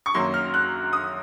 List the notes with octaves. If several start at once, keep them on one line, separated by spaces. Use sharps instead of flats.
C#6
F#2 D#3 F#3 A#3 C6
F6
F#6
D#6